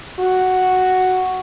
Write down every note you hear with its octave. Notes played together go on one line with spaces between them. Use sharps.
F#4